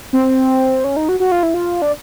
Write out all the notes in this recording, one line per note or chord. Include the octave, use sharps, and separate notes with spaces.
C4
C#4
D#4
F#4
F#4
F4
E4
F4
D4